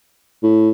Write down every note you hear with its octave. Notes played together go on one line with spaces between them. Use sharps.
A2